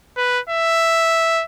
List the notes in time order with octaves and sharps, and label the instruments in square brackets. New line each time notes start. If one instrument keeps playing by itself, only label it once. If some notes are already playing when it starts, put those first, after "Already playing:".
[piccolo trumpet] B4
E5